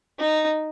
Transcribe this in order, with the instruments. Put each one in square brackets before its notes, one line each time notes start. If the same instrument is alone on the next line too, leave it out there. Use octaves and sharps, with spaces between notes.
[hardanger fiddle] D#4